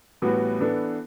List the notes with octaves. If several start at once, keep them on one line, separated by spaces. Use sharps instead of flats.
A2 E3 G3 B3 F#4
E3 B3 D4 A4